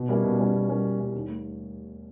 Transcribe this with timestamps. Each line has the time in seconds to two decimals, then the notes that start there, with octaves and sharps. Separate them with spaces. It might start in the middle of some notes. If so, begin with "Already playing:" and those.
Already playing: B2
0.09 G3 A#3 C#4 E4
0.24 B2
0.38 G3 A#3 C#4 E4
0.55 B2
0.69 G3 A#3 C#4 E4
0.84 B2
0.99 G3 A#3 C#4 E4
1.15 D#2
1.29 A3